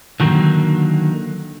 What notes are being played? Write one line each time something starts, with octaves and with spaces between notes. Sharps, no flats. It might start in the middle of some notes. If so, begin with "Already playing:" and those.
D3 D#3 F#3 A#3